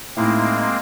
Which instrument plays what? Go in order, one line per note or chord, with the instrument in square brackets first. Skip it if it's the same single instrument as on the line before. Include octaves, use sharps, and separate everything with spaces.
[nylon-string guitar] A2 D#4 E4 [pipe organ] G#3 A#3 C4